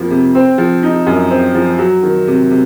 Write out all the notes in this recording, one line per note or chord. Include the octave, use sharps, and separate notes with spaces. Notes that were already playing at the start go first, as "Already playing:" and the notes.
Already playing: F2 F3 A#3
C3
C4
F3
D#4
F#2
C4
F3
F#3
D#3
C3
C3